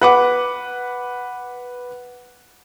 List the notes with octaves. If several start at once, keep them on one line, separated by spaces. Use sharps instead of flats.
B4 F#5 D6